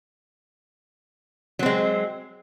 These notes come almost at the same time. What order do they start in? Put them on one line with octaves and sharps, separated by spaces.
F#3 C4 G#3